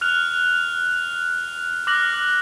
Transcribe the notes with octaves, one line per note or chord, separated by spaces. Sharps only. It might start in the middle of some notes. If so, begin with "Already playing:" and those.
F6 F#6 F7
D6 F6 F#6 A#6 F#7